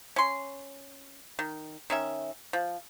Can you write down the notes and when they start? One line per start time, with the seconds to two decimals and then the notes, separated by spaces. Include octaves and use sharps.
0.16 C#4 C6
1.39 D#3
1.90 D#3 C#4 E5
2.53 F3